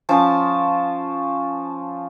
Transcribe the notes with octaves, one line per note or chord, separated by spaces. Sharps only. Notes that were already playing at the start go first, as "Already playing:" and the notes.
F3 C#4 C5 A5